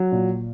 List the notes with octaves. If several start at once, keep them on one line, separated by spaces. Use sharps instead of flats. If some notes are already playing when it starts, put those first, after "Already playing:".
Already playing: F#3
A#2